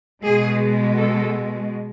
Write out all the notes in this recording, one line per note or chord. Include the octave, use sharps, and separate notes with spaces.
B2 G#3 G#4
A4